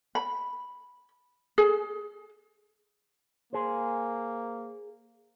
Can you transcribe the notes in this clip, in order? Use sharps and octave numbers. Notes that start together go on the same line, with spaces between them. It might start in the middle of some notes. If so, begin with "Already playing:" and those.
B5
G#4
A#3 G#4 C5